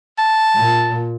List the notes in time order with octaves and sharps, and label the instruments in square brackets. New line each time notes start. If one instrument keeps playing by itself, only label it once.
[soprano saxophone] A5
[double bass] A#2